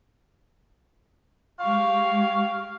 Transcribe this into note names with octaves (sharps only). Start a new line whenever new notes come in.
G#3 G4 F5 C#6